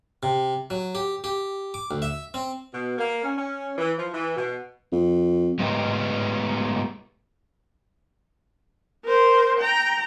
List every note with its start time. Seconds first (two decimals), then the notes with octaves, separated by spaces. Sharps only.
0.23 C3
0.70 F#3
0.95 G4
1.24 G4
1.74 D6
1.91 D2
2.02 E5
2.34 C4
2.73 B2
2.98 A#3
3.23 C#4
3.37 C#4
3.78 E3
3.96 F3
4.14 E3
4.37 B2
4.93 F2
5.59 G#3 A3 B3 D#4 G4 B4
9.05 A#4 C5
9.60 G5 A#5